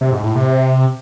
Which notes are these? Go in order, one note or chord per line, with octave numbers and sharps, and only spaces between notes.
C3
G#2
A2
C3